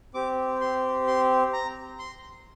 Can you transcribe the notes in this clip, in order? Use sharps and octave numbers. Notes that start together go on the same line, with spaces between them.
C4 G4 D6
C6
C6
A#5
C6